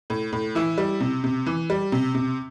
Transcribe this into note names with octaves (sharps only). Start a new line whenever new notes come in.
A2
A2
E3 E4
G3
C3
C3
E3
G3
C3
C3